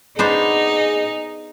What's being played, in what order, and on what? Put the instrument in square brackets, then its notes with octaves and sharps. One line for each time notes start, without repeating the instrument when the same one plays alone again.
[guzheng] B3 D4 C5 [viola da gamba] D#4 [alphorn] G#4